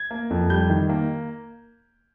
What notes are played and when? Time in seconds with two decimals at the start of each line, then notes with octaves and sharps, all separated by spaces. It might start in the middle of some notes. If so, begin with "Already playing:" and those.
Already playing: G#6
0.11 A#3
0.30 F2
0.50 G3 G6
0.70 D#3
0.89 A#3